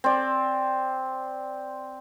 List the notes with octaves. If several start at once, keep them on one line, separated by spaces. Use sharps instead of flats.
C4 D5